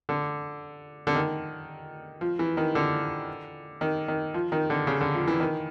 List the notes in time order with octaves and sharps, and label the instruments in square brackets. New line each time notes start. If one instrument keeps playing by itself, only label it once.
[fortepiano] D3
D3
D#3
F3
E3
D#3
D3
D#3
D#3
F3
D#3
D3
C#3
D3
F3
E3
D#3